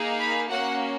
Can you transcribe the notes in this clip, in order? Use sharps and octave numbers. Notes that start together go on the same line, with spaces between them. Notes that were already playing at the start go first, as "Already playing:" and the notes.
Already playing: A#3 D#4 G#4
B5
A#3 C#4 F#4 F#5